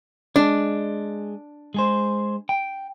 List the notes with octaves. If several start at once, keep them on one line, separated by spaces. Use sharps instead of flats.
G#3 D4
G#3 G#4 C5
G5